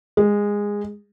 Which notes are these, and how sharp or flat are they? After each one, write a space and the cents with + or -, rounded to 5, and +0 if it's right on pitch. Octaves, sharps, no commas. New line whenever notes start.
G#3 -15